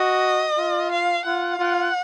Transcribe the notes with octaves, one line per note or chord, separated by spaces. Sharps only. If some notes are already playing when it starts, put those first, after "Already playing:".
Already playing: F#4 D#5
F4
F5
F4 F#5
F4